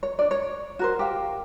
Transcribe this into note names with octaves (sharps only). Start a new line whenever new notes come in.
C#5
D4 D5
C#5
F#4 A#4 C5
G4 F5